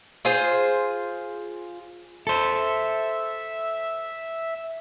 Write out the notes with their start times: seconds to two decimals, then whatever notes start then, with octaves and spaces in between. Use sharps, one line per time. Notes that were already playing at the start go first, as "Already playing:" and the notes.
0.25 F4 G#4 C5
2.27 A4 C5 E5